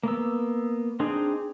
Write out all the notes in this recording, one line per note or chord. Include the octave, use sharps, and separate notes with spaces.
A#3 B3 E6
C4 D4 D#4 G#4 C5